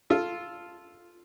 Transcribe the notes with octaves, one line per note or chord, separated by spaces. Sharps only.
F4 A4